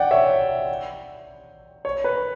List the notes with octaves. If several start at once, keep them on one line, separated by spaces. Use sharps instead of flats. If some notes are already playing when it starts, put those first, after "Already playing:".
Already playing: D5 F#5 G5
C#5 E5
C#5
B4